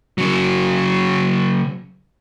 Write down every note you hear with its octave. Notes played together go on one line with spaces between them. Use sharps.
C#3 F#3